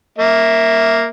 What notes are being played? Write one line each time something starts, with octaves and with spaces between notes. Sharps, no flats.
A#3 E5